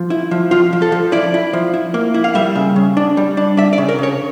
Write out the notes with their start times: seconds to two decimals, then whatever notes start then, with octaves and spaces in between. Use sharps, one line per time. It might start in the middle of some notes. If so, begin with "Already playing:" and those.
Already playing: F3
0.10 E4
0.31 F3
0.51 F3 F4
0.73 F3
0.82 A4
0.92 F3
1.12 E4 D5
1.34 E4
1.53 F3
1.74 E4
1.94 A#3
2.14 E4
2.24 F5
2.35 G3 E5
2.55 C#3
2.76 C#3
2.97 D4
3.17 G3
3.37 D4
3.57 D4 E5
3.73 D5
3.78 C#3
3.89 A#4
3.99 C#3 C#5